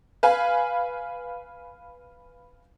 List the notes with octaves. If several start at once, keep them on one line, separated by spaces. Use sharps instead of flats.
B4 F5 G#5 B5